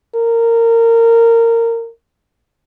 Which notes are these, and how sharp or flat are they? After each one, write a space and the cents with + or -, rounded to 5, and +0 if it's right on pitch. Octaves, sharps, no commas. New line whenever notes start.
A#4 -20